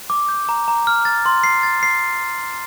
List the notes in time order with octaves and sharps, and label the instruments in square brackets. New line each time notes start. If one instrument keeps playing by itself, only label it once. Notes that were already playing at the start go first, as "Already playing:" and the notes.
[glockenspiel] D6
G6
A#5
A#5
F6
A6
C6
C7
A6
C7